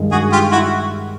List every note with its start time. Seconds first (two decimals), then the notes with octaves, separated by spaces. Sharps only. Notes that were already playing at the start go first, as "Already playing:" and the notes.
Already playing: G2 D#3 G#3
0.11 F#4 G#4
0.32 F4 G4
0.51 E4 F#4